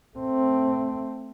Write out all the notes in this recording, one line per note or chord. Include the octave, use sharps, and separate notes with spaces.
A3 C4